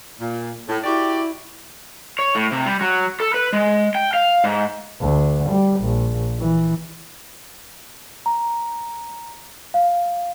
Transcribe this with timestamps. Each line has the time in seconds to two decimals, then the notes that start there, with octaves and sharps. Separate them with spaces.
0.20 A#2
0.69 A2
0.84 E4 F#4 G4 D5
2.19 C#5
2.35 A2
2.52 C3
2.66 G3
2.81 F#3
3.20 A4
3.34 B4
3.53 G#3
3.95 G5
4.14 F5
4.44 G#2
5.01 D2
5.50 G3
5.80 A#1
6.39 E3
8.26 A#5
9.74 F5